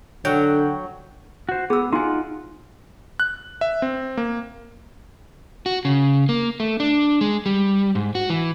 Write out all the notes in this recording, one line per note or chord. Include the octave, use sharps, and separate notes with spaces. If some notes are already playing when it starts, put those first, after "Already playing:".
D3 F#3 F#5 G5
F#4 C5
B3 G#4 E6
D#4 F4 F#4 F#5 G#5
F#6
E5
C4
A#3
F#4
C#3
A#3
A3
D4
G#3
G3
G#2
F#4
E3